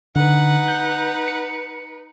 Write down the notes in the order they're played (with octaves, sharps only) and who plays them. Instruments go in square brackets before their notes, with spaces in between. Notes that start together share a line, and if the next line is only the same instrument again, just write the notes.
[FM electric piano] D3 [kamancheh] D#4 B4 [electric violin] F#5
[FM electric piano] G6
C#7